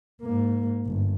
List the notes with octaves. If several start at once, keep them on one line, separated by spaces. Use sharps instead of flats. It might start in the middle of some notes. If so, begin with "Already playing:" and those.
G#2 A#3
G1